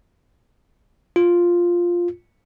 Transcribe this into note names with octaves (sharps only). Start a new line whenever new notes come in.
F4